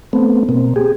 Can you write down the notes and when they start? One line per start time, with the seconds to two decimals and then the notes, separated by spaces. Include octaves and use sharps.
0.13 A3 B3 C4
0.49 B2 A#3 C4
0.76 G4 G#4